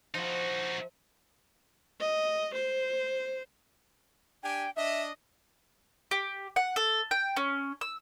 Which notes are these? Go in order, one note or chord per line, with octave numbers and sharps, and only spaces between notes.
F3 D#4 F#4
D#5
C5
D4 G4 G5 G#5
D4 D#5 E5
G4
F#5
A4
G5
C#4
E6